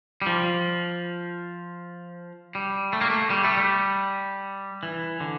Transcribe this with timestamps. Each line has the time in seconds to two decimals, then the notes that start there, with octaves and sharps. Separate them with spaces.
0.22 G3
0.26 F3
2.55 G3
2.93 A3
3.01 A#3
3.10 A3
3.30 G3
3.44 A3
3.57 G3
4.83 E3
5.20 D3